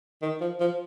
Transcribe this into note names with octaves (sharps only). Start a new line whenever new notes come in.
D#3
F3
F3